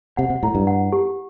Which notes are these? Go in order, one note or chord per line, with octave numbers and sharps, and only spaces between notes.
C3 F#5
C3
A2 E4
G2
F#5
G4